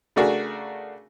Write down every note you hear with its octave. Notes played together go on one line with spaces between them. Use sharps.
C#3 A3 D4 F#4 G#4 A#4